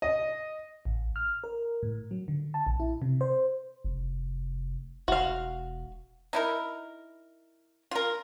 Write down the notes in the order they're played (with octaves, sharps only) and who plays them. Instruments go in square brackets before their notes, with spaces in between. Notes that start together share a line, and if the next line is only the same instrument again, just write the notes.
[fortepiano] D#5
[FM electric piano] A1
F6
A#4
A2
F#3
D3
A5
A#1
E4
C3
C5
[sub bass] F1
[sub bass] E1 [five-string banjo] F#4 F5
[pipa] D#4 E4 A#4
F4 A#4